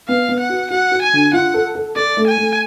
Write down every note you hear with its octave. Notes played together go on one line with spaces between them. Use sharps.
B3 F5
B3
F#5
F#4
F#4 F#5
F#4
G#5
D3
F4 F#5
A4
A4
A4 D5
A3
G#5
A3